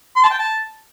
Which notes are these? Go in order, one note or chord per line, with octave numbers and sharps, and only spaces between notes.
C6
A5
G5
A5